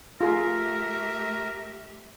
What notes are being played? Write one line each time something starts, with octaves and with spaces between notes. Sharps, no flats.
A3 F4 G4 G#4 A#4 E5